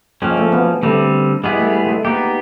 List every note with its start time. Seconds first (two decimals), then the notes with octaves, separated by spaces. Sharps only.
0.22 F3 G#3 A#3 C#4
0.37 A3
0.52 B3
0.83 D3 G3 A3 C4
1.44 G3 G#3 B3 E4 G#4
1.59 A3
1.74 A3
1.84 G#3
1.89 A3
2.05 A#3 B3 D#4 G4